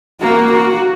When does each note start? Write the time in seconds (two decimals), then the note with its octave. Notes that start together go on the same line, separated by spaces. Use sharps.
0.21 A#3 F#4
0.53 F#4